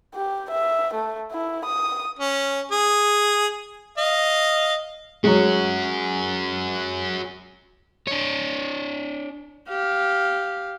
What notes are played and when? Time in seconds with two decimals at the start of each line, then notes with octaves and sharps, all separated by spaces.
0.15 G4
0.50 E5
0.94 A3
1.31 E4
1.65 D#6
2.19 C#4
2.71 G#4
3.98 D#5 F5
5.24 F#3 G#3 C#4 F#4
8.07 D4 C#5
9.68 G4 F5